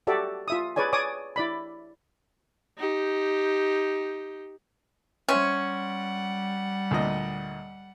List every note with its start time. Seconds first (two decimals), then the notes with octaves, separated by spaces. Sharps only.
0.07 F#4 G4 A4 D5 E5
0.48 F4 E5 D#6
0.76 G#4 B4 C#5 D5 G#5
0.93 C#5 D5 G#5 D6 D#6
1.36 E4 D5 B5
2.78 D#4 G4
5.29 G3 C#4 C5 E5 F#5 G#5
6.91 D2 A#2 D#5